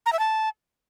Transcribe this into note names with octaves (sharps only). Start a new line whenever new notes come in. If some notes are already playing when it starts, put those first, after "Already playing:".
A#5
E5
A5